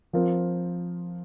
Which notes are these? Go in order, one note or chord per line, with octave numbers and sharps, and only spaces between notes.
F3 C4 F4 A#4